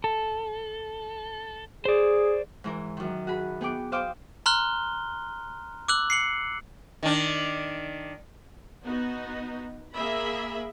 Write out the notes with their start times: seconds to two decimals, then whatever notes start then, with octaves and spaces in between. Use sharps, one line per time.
0.04 A4
1.85 G#4 C5 D5
2.64 G#2 E3 A#4
2.97 F#2 D#3
3.27 F#4 G#4 B5
3.61 B3 G#4 G5 D6
3.92 C5 D#5 F5 G5 D6
4.46 A#5 C6 F6 F#6 G7
5.88 D6 E6 F#6 F#7
6.10 C7 C#7 F#7
7.03 D#3 D4
8.84 B3 D#4 F#4
9.93 A#3 G#4 E5 B5